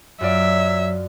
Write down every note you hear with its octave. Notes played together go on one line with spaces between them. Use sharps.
F#2 F#3 F4 D5 E5